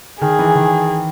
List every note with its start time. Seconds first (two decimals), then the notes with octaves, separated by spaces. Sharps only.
0.21 D#3 G#4
0.39 E3
0.55 D#3